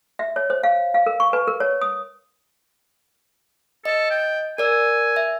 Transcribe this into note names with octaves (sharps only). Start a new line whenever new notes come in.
E5
C#5
C5
F5
F5
A#4
C#6
B4
A#4
C#5
D#6
A4 D#5
G5
A#4 D5 G#5 E6
E5